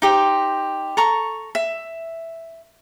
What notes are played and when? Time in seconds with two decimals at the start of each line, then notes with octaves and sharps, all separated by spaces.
0.02 D#4 G4 C5
0.97 A4 A#5 C#6
1.55 E5